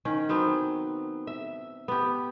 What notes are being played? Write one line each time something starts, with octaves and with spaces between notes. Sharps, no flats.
D#3 C#4
F#3 B3 C4
E5
B3 G4